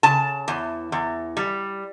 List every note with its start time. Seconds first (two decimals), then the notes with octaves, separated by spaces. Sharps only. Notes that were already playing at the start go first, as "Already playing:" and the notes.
0.03 C#3 A5
0.48 E2
0.92 E2
1.37 G3